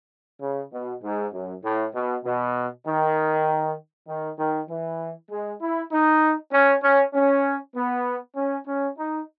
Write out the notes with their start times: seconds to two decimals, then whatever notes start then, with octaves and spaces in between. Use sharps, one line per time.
0.41 C#3
0.72 B2
1.03 G#2
1.33 F#2
1.64 A2
1.94 B2
2.24 B2
2.87 D#3
4.08 D#3
4.39 D#3
4.69 E3
5.30 G#3
5.61 E4
5.92 D#4
6.53 C#4
6.83 C#4
7.14 C#4
7.75 B3
8.36 C#4
8.67 C#4
8.98 D#4